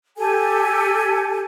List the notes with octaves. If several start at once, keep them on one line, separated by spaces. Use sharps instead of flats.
G4 A4 G#5